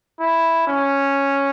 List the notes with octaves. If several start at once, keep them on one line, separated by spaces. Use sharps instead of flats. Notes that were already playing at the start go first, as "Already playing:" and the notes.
E4
C#4